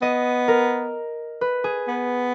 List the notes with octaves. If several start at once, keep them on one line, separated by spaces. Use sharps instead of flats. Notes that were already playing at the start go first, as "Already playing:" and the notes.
B3 D#5
A#4
B4
G#4
B3